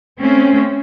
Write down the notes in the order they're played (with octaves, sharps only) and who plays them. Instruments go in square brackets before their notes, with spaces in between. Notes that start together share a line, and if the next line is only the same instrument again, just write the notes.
[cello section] A3 C4 C#4